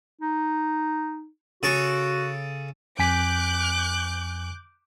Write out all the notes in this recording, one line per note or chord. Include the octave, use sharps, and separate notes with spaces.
D#4
C#3 F#4 A4 C#6
F2 G#5 D6 F#6 G6 B6